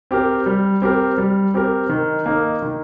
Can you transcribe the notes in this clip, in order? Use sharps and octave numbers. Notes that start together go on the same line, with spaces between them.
C4 G4 A#4
G3
C4 G4 A#4
G3
C4 G4 A#4
D#3
A#3 D#4 A#4
D#3